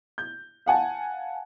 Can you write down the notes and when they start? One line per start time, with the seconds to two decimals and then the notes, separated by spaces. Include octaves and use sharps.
0.18 G6
0.66 F5 F#5 G#5 A5